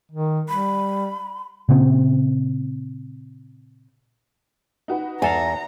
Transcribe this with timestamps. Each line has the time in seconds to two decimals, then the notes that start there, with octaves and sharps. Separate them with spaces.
0.12 D#3
0.49 G3 B5
1.69 A#2 C#3 B3 C4
4.88 D#4 F#4 B4
5.22 E2 A4 F5 G#5 A#5